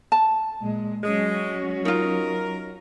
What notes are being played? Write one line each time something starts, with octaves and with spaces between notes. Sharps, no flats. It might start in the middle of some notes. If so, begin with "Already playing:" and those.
A5
A#2 G#3
F#3 G#3 C#4 F#4
D#4 F4 A#4